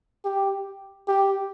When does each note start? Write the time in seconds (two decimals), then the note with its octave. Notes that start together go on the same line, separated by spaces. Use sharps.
0.25 G4
1.08 G4